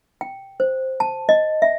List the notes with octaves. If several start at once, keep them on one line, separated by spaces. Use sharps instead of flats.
G5
C5
A5
D#5
E5